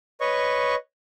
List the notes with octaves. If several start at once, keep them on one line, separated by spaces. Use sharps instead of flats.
B4 C#5 D#5 C#6